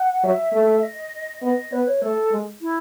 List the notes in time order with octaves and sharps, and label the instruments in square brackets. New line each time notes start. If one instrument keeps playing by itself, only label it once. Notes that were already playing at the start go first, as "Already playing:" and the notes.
Already playing: [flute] F#5
[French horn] F#3 [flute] E5
[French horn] A3
[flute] D#5
[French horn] B3 [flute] D#5
[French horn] B3 [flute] B4
[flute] C#5
[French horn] A3 [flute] A4
[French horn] G#3
[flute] E4